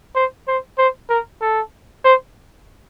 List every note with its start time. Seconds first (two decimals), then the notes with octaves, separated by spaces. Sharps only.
0.15 C5
0.48 C5
0.78 C5
1.10 A#4
1.42 A4
2.05 C5